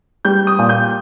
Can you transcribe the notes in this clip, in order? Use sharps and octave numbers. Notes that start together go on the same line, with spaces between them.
G3 G6
D#6
A#2
G6